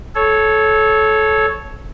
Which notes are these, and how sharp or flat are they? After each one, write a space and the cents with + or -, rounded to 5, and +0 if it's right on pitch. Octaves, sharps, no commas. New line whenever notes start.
A4 -20 C#5 +0